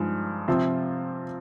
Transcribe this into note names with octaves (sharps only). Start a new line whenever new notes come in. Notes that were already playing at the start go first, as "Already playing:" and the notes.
Already playing: G2 F3 G#3 D#4
C3 F3 C4 F4